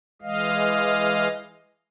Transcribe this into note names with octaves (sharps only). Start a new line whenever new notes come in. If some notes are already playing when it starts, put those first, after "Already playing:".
E3 G#3 D#5 F5